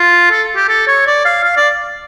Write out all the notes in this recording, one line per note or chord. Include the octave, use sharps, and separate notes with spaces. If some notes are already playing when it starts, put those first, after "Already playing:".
Already playing: F4
A4
G4
A4
C#5
D5
F5
F5
D5